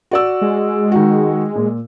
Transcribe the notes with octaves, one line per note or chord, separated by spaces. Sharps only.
F#4 D5 E6
G#3
D#3 F#4
A#2